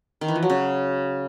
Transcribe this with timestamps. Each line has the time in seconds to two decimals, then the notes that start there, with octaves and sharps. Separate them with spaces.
0.21 D#3
0.28 E3
0.35 F3
0.43 F#3
0.50 C#3